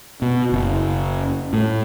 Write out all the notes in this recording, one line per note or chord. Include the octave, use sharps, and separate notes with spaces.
B2
F#1
A2